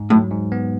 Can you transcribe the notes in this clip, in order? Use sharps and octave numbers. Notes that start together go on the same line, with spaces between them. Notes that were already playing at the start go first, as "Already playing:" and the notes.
Already playing: G#2
A2 F#3
G#2
B3